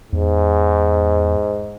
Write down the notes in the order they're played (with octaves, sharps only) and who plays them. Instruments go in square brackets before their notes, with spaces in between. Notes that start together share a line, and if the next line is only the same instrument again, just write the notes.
[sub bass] E2 [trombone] G#2